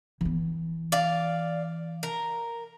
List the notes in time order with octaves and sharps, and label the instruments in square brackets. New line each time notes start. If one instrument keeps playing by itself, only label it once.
[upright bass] E3 B3
[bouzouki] D5 F5
A#4